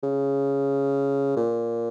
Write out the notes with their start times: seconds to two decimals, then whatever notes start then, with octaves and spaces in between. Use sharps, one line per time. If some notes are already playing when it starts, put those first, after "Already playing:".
0.03 C#3
1.37 A#2